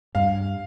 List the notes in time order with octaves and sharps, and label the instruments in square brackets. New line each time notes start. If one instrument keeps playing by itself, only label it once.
[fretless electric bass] G2 [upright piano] F5